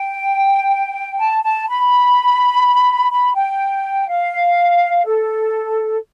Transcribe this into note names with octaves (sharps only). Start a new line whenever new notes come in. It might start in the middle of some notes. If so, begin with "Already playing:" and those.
Already playing: G5
A5
A5
B5
B5
G5
F5
A4